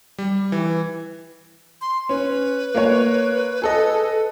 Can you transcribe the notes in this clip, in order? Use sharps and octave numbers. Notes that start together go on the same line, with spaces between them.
G3
E3
C6
C#4 B4
A#3 C#5
G#4 A4 D#5